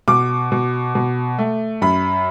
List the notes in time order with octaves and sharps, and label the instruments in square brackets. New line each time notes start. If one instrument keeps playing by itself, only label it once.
[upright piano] B2 D6
B2
B2
A3
F#2 B5